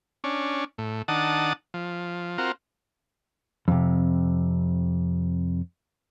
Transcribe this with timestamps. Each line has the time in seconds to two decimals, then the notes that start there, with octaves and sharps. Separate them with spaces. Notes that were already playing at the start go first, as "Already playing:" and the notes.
0.24 C#4 D4
0.78 A2
1.08 D#3 D4 F#5 A5 D#6
1.74 F3
2.38 C4 F4 F#4 A#4
3.68 F2 C3